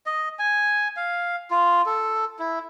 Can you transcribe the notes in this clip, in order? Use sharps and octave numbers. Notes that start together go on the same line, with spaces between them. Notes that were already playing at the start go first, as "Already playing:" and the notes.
D#5
G#5
F5
F4
A4
E4